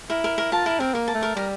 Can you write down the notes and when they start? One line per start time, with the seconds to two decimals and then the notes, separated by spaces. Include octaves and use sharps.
0.10 E4 A#4
0.24 A#4
0.38 A#4
0.52 F4 A5
0.66 E4 A#4
0.80 C4 A#4
0.94 A#3 A#4
1.08 A5
1.15 A3
1.23 A#4
1.36 G3 A#4